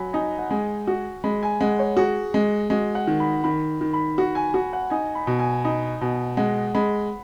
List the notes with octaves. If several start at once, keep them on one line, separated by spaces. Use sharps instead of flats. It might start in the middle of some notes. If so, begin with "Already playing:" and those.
Already playing: F#3 G#5 B5
D#4 G#5
F#5
G#3 G#5
F#4
G#3 B5
G#5
G#3 F#5
C#5
F#4 G#4
G#3
G#3 F#4
F#5
D#3
B5
D#3 B5
D#3
B5
F#4
G#5
F#4 G#5
F#5
D#4 G#5
B5
B2
G#5
D#4 B5
B2 G#5
G#3 F#5
G#3 B5